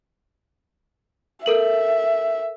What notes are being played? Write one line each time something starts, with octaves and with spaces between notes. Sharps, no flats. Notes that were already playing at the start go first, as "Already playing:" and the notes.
A4 A#4 E5 F#7